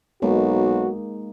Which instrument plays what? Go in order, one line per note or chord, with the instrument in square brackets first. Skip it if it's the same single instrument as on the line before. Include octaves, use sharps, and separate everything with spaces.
[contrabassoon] B1 [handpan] G#3 A#3 D#4 [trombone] F#4